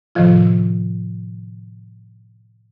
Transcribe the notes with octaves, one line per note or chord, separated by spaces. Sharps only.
A2 C3 D#3 F3 F4